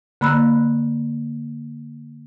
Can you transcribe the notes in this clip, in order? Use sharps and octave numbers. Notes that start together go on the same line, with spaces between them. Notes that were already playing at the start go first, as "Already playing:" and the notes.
D3 A#3 B5 E6 F#6